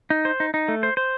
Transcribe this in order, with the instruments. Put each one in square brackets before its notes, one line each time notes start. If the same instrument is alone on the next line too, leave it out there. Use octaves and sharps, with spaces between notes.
[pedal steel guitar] D#4
C5
D#4
D#4
A3
C5
C5